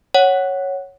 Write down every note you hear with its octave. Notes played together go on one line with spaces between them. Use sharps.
C#5 F#5